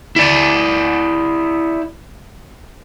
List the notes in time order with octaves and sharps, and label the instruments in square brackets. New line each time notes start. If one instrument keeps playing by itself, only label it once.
[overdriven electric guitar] E4 D5